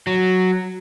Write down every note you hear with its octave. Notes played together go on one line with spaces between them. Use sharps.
F#3